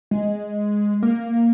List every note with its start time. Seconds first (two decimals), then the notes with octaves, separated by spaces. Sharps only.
0.11 G#3
1.03 A#3